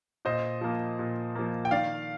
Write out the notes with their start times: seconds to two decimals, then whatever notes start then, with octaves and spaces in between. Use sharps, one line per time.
0.25 A#2 C5 D#5
0.61 F3 A#3
0.99 A#2
1.35 F3 A#3
1.65 G5
1.71 D#3 D5 F5